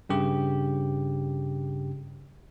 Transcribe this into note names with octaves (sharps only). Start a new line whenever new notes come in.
G2 C#3 G4